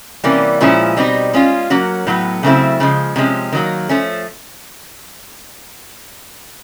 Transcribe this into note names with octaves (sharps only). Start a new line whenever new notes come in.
C3 E3 G3 A#3 C#4
A#2 F3 G#3 C#4 E4
B2 G3 C4 D#4
G#3 C#4 F4
F#3 A#3 C#4 F#4
A2 F#3 B3
C#3 F#3 A3 C4 E4
C#3 F3 G#3
C3 F3 G#3 C#4
D#3 F#3 A#3
F3 A3 C#4